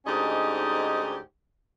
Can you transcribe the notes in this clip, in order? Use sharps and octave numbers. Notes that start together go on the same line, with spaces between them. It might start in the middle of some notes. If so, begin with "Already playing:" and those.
D2 G#2 C#4 D#4 G4 D#5